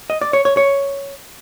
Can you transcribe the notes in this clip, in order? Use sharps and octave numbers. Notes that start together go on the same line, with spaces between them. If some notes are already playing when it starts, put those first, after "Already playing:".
D#5
D5
C#5
C#5
C#5